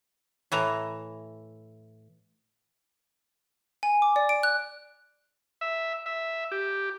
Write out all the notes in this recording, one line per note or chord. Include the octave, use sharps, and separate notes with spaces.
A2 E3 A#5
G#5
D6
D5
D7
F#6
E5
E5
G4